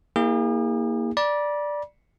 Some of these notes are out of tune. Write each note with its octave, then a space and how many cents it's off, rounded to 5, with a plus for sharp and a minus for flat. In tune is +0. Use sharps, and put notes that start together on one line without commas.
A#3 +0 E4 -45 G#4 -45
D5 +0 B5 -45